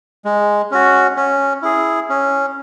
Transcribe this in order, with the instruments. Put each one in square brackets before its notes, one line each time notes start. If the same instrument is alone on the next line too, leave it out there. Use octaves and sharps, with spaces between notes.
[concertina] G#3
C#4 F#4
C#4
E4 G#4
C#4